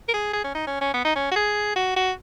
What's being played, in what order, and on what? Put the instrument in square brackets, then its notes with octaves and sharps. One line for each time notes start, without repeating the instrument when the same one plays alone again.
[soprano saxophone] A#4
G#4
G#4
C#4
D#4
C#4
C#4
B3
D#4
C#4
F#4
G#4
F#4
F#4